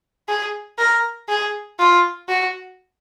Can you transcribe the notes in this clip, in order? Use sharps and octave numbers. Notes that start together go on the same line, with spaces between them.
G#4
A#4
G#4
F4
F#4